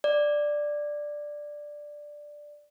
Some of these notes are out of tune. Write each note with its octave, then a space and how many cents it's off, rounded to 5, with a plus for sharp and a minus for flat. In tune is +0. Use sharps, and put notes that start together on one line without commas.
D5 +5